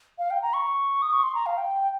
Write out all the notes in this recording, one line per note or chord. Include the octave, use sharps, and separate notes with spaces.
F5
G5
A#5
C#6
D#6
C#6
C6
A#5
F5
G5